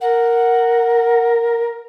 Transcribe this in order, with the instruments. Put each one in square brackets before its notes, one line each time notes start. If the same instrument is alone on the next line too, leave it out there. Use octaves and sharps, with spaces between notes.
[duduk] A#4 [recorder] F#5